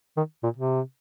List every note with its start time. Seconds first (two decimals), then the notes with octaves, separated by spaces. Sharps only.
0.17 D#3
0.43 A#2
0.57 C3